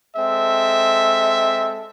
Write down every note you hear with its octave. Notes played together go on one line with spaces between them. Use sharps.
G#3 C4 A4 E5